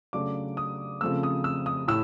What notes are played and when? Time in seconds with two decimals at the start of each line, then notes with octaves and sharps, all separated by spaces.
0.13 C#3 F#3 A3 D4 D6
0.57 D#6
1.01 C#3 F3 A3 C4 E6
1.23 D#6
1.44 E6
1.66 D#6
1.88 A2 E6